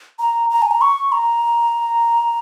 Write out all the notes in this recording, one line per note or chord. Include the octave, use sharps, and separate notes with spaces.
A#5
A#5
G#5
A#5
C#6
A#5